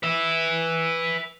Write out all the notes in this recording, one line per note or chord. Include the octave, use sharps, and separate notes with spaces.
B4 E5